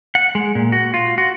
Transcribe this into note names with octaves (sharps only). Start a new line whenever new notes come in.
F#5
G#3
A#2
F#4
F4
F#4